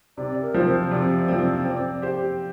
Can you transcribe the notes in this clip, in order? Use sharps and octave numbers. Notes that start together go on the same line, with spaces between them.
C3 D5
A#4
F3 C4
C5
C3 D5
F3 C4
C4
G4 C5